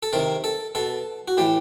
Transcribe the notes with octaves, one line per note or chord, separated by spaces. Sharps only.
A4
C3 D#3 A#4
A4
B2 A4
F#4
A2 E3 G4